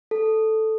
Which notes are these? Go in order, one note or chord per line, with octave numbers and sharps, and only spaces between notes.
A4